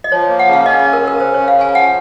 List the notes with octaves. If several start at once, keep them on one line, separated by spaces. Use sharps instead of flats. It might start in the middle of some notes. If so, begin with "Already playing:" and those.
D#5
F3 C#5
A#3
F#5
C#3
F5
C#4 D#5
C#3 D#5
A#4
C#4
A#4
C#3 C5
C#3 C#5
F5
C#4 G#5
G#5
F3 F#5